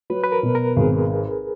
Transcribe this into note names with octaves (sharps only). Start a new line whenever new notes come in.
F#3 B4
B4
A#4
B2
A#4
G#1 G#4